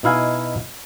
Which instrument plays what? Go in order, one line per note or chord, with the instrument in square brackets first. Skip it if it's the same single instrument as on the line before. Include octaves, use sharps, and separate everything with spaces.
[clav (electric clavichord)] B2 D#4 E4 F5 G#5